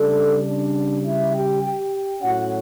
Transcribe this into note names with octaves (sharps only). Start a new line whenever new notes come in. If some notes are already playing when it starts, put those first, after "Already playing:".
Already playing: C#3 G3 A3 D4 A4
D4 D5
E4 E5
G4 G5
G4 G5
A2 F#3 C#4 F#4 F#5